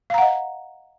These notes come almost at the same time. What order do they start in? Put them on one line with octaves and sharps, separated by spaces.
F5 A#5 F#5 D#5